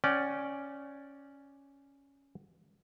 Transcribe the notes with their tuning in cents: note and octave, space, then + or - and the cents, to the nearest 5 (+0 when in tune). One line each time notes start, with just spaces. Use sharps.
C#4 +0 D5 +0 G5 -40